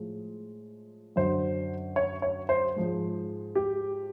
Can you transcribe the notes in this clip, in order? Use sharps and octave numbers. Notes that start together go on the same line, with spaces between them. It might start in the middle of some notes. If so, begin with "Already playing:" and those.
Already playing: A2 F3 G#3
F#2 D3 F#3 C5
C#5
C#5
C5
G#2 F3 G#3
G4